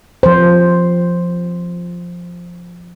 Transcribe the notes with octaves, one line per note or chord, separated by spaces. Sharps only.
F3 C5